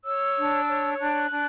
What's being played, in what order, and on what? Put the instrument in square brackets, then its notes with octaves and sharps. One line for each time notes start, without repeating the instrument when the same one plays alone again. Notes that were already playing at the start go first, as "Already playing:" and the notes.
[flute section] C#5 E6
D4
C#5
E6
D4 F#6
D4